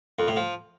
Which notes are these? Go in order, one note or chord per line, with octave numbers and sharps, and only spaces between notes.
F2
A2
F3